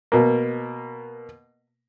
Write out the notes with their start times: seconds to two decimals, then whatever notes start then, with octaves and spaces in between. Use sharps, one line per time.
0.12 B2 A#3